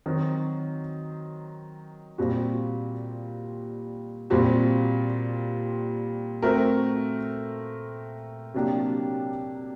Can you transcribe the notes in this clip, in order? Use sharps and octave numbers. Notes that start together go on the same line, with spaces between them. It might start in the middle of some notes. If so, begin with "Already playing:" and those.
D#3 F#3 C4 F#4
A#2 G3 C4 F#4
A#2 G3 C4 F#4
A3 C4 F#4 A#4
C3 F#3 A#3 D4 G4